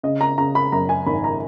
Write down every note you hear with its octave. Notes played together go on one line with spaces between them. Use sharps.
C#3 D#5
A#5
C#3 A#5
B5
F#2 A#5
G#5
G#1 B5
A#5